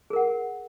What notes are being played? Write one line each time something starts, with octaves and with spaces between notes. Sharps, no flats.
G#4 A#4 F#5